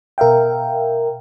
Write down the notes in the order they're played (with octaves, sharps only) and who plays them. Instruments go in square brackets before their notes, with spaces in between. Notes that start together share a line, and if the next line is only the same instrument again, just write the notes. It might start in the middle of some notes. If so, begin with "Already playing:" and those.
[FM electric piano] B2 A#4 E5 F5 G5